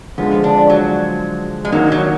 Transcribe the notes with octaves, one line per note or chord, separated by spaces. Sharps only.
D3 F3 G#3 B3
D4
F#3
G#3
D#3 F#3 A#3 D#4
F#3